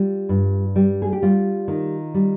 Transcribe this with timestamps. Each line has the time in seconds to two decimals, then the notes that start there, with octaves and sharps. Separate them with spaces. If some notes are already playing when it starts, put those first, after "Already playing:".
Already playing: G3 F4
0.29 G2
0.76 G3
1.02 G#4
1.13 G4
1.22 G3 F4
1.68 D#3
2.14 G3